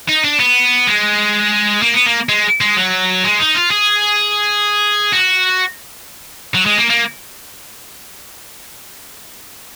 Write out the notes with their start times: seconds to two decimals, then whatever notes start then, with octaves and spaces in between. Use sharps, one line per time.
0.09 D#4
0.25 D4
0.40 B3
0.87 G#3
1.82 A#3
1.94 B3
2.06 A#3
2.29 G#3
2.61 G#3
2.77 F#3
3.24 G#3
3.40 D#4
3.55 F4
3.71 G#4
5.13 F#4
6.55 F#3
6.66 G#3
6.78 A#3
6.90 A#3